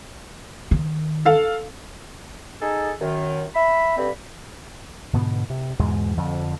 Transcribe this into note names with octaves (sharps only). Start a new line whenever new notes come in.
D#3
A4 F5
D#4 G#4 A4
F#2 D#3
E5 B5
G2 D3 C4 B5
G#2 B2 D3 B3
C3
E2 G#2 B2 G#3
F2 D3 F3